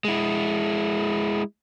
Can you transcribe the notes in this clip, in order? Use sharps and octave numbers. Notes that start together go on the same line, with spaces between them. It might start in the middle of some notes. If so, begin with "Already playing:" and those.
G#3 E4